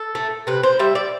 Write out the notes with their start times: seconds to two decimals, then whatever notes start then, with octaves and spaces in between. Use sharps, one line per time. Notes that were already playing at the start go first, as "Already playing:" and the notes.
Already playing: A4
0.15 A3
0.47 C3 B4
0.63 C5
0.79 G3 E5
0.95 D5